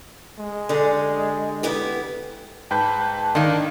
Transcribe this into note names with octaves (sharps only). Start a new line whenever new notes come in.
G#3
D3 G3 G#4
B3 E4 G4
G#2 B4 G5 A5 B5 G6
D#3 A#3 D4